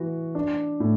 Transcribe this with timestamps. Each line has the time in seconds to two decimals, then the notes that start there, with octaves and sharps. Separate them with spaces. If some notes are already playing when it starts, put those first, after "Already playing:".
Already playing: E3 F#4
0.35 D4
0.80 A2